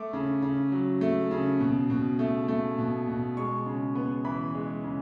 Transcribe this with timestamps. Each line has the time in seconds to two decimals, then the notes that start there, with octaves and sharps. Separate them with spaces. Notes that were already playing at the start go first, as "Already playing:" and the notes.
Already playing: A3 D6
0.13 C#3
0.42 C#3
0.72 F#3
1.01 A3
1.31 C#3
1.60 B2
1.90 B2
2.19 A3
2.48 A3
2.78 B2
3.07 B2
3.37 G#3 C#6
3.66 C#3
3.95 B3
4.25 E3 B5
4.54 G#3
4.84 C#3